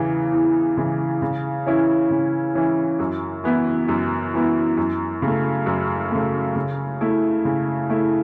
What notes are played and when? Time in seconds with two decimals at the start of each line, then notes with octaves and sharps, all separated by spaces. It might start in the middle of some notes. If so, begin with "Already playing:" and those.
Already playing: E2 C#3 E3
0.32 E2
0.77 C#3 E3
1.22 C#3
1.66 E3 C#4 E4
2.10 C#3
2.55 E3 C#4 E4
2.99 F#2
3.44 E3 B3 E4
3.88 F#2
4.34 E3 B3 E4
4.77 F#2
5.22 C#3 A3
5.66 F#2
6.11 C#3 A3
6.56 C#3
7.01 A3 E4
7.45 C#3
7.89 A3 E4